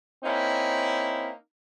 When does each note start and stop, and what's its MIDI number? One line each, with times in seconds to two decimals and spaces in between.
0.24 1.31 58
0.24 1.31 60
0.24 1.31 61
0.24 1.31 63
0.24 1.31 64